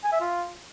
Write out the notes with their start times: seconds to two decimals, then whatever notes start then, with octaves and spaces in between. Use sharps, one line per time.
0.04 G#5
0.12 E5
0.21 F4